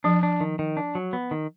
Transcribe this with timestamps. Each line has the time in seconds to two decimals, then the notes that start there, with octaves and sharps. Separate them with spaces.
0.04 F3 D4
0.23 D4
0.40 D#3
0.59 D#3
0.77 D4
0.95 F#3
1.13 B3
1.31 D#3